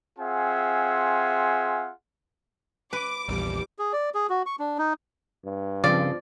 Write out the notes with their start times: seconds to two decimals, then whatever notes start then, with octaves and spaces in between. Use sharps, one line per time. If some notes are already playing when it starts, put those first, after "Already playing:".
0.19 C4 F4 G#4 E5 F#5 G#5
2.93 B4 D6
3.29 A#1 E2 G3
3.79 G#4
3.93 D5
4.14 G#4
4.29 F#4
4.46 C#6
4.59 D4
4.78 D#4
5.45 G2
5.84 C#3 F3 C4 D5